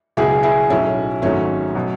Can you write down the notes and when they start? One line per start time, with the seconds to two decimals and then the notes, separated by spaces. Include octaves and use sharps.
0.17 C#2 B2 F#3 E4 G#4
0.43 E4 G#4
0.70 B1 A2 F#3 C#4 E4
1.22 G#1 G#2 F#3 A3 C#4
1.75 B2 F#3